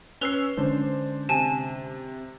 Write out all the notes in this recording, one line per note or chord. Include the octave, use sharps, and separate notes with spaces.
C#4 B4 E6 C7 F7 G7
D3 G#3 C#4 D4 C5
C3 G#5 A5